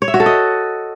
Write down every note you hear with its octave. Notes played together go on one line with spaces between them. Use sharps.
C#5
E5
F#4
A4
D#5